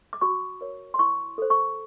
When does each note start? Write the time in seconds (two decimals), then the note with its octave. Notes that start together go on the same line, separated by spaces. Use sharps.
0.13 D6
0.21 F#4 C#6
0.61 A#4 C#5
0.94 C6
0.99 E4 C#6
1.38 A4 C5
1.50 C#6